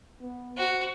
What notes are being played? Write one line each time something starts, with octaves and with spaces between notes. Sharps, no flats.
B3
F#4 C5